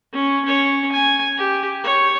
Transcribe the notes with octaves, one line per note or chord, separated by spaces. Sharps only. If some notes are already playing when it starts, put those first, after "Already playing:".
C#4
C#4 C#5
G#5
G4
C#5